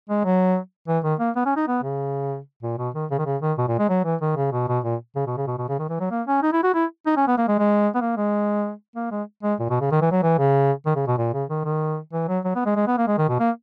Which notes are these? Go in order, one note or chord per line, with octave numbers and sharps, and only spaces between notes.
G#3
F#3
E3
D#3
A#3
B3
C#4
D#4
B3
C#3
A#2
B2
D#3
C#3
D#3
C#3
D#3
B2
A#2
G#3
F#3
E3
D#3
C#3
B2
B2
A#2
C#3
B2
C#3
B2
B2
C#3
D#3
E3
F#3
A#3
C#4
D#4
E4
F#4
E4
D#4
C#4
B3
A#3
G#3
G#3
B3
A#3
G#3
A#3
G#3
G#3
A#2
B2
C#3
D#3
E3
F#3
E3
C#3
D#3
C#3
B2
A#2
C#3
D#3
D#3
E3
F#3
F#3
B3
G#3
G#3
B3
A#3
G#3
D#3
B2
A#3